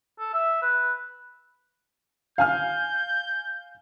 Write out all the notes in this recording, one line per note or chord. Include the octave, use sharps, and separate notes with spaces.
A4
E5
B4
F5 G#5 F6 G6